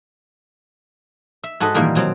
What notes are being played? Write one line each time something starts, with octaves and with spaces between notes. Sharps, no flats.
E5
G#2 F#4 A4 B4 D#5
A#2 D#3 E3 G3 A#3
B2 F#3 C4